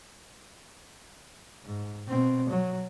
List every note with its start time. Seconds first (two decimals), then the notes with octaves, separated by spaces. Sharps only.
1.65 G#2
2.08 B2 C4
2.49 F#3